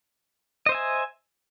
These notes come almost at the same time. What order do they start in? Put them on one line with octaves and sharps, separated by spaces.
D#5 C5 E5 G#5